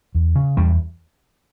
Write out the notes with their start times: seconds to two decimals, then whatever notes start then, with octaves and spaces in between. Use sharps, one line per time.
0.15 E2
0.36 C#3
0.57 E2 G3